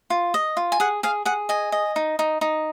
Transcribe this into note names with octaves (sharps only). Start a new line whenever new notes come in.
F4
D#5
F4
G#5
G#4 F#5
G#4 F5
G#4 F#5
D#5 G#5
D#5
D#4
D#4
D#4